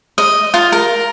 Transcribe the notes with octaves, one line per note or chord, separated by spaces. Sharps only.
D#5
F4
A#4